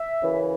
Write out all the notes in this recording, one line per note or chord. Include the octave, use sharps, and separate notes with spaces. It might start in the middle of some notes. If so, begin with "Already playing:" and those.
Already playing: E5
F#2 C#3 E3